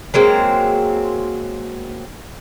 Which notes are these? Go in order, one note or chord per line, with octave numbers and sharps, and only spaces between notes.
F#3 G#3 A#3 C4